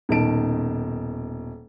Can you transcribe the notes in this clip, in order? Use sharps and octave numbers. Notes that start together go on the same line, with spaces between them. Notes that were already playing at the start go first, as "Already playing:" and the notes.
D#1 B2 D#3 D#4 A5 D7